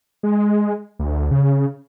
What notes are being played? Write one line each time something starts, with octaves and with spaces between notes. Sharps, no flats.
G#3
D2
C#3